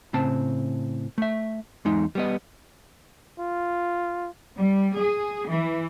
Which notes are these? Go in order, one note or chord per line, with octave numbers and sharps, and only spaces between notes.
A2 C#3 C4 A5
A3 E5
E2 G#3 D#4
G3 B3 D#5
F4
G3
G#4
E3